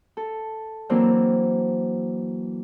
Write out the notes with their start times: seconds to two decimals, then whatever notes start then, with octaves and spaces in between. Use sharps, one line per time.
0.17 A4
0.89 E3 F#3 A#3 C4 D4